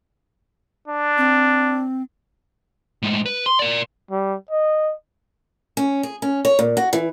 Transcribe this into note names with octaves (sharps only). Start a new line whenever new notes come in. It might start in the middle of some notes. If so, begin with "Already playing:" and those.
D4
C4
A2 G#3
B4
C6
A#4 D5
G3
D#5
C#4
G#4
C#4
C#5
A#2
F#4
E3